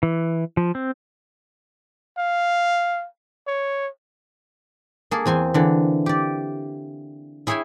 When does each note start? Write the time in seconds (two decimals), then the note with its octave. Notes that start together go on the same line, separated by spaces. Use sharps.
0.03 E3
0.57 F3
0.75 C4
2.18 F5
3.47 C#5
5.11 A#3 G#4 A4
5.26 E2 C4 G#5 C6
5.54 D3 E3
6.06 G4 D5
7.47 E4 G#4 C#5 E5 G5 G#5